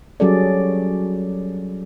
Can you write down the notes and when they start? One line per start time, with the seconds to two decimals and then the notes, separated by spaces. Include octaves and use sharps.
0.20 F#3 G3 C#4 G#4 A4 D5